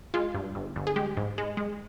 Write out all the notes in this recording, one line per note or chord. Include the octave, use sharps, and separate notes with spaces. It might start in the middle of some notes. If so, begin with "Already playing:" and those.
G#3 F4
G2
G1
G1
G#4
G#3 G4
G#2
G#3
G#3